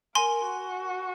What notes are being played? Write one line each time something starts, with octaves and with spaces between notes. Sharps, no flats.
A#4 G#5 C6
F#4